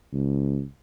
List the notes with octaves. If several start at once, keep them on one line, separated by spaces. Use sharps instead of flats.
C#2